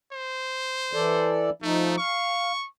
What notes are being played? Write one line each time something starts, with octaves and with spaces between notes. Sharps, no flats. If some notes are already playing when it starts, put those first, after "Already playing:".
C5
E3 A4 D5
F3 A3 D#4
F5 C#6